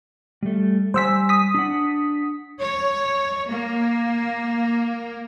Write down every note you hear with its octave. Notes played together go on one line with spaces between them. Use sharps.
G3 A3
G3 C5 F#5 G#5 E6 B6
D#6 B6
D4 F#5
C#5
A#3